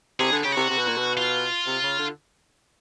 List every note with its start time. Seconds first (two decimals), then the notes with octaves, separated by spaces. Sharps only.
0.20 C3 G#4
0.32 D3
0.44 C#3 G4
0.52 C3 F#4
0.69 C3
0.78 B2
0.88 A#2
0.97 B2
1.17 F4
1.66 C3
1.83 C#3
1.99 D3